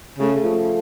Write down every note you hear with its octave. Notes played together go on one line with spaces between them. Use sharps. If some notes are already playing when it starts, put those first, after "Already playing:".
C#3 A3
F3